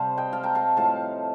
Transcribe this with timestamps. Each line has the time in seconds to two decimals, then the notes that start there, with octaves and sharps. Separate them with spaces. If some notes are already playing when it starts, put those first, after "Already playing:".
Already playing: C3 G3 C5 F5 A5
0.17 D#5 G5
0.33 F5 A5
0.43 G5 A#5
0.55 F5 A5
0.77 A2 F3 A3 F5 A5